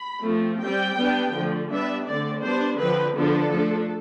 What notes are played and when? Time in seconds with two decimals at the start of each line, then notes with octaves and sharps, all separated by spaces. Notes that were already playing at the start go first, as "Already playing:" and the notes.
Already playing: B5
0.25 F3 A3 C4
0.62 G3 C4 G5
0.98 G3 B3 D4
1.34 D3 F3 A3
1.70 G3 B3 D4 E5
2.07 D3 A3 C4 D5
2.42 G3 B3 D4 C5
2.79 D3 F3 C4 B4
3.14 D3 F3 B3 D4 A4
3.51 F3 A3 D4